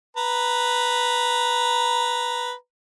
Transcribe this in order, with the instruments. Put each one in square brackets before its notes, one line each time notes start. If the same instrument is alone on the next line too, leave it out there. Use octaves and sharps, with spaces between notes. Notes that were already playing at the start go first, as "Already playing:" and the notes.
[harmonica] B4 A#5